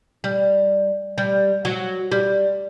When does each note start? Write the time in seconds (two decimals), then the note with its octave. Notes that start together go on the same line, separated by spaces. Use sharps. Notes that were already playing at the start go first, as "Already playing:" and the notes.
0.24 G3
1.18 G3
1.65 F#3
2.11 G3